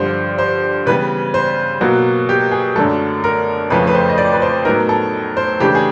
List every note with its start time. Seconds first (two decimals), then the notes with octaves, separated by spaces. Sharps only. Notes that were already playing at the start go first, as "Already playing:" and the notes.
Already playing: G2 D3 F3 C5
0.38 C5
0.86 C#3 E3 G3 B3 B4
1.34 C5
1.81 B2 F#3 A#3 F#4
2.29 G4
2.51 G#4
2.76 F#2 D3 F#3 A3 A4
3.24 A#4
3.70 F2 C#3 F3 A3 C#4 B4
3.87 B4
3.94 C5
4.09 D#5
4.18 D5
4.33 B4
4.42 C5
4.65 A2 F#3 B3 D#4 A#4
4.89 A4
5.37 C5
5.60 C#3 E3 A3 D4 G4
5.75 G#4